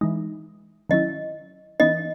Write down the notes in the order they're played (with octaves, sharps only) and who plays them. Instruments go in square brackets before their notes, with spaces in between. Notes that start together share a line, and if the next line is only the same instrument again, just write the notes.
[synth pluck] E3 G#3 D#4
[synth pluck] D#3 F#3 C#4 E4 [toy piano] D#5
[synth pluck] E3 B3 D#4 [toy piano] D#5